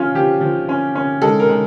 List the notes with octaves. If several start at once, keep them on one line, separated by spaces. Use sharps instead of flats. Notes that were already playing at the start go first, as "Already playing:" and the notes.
Already playing: F3 C#4 F4
F3 G4
F3
C#4
C#4
G#3 A4
A#4
G#3